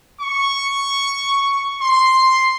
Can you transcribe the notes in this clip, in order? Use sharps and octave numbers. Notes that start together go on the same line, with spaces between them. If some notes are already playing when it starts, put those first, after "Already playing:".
C#6
C6